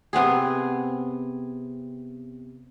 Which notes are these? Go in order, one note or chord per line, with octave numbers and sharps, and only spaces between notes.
C3 B3 C4 G#4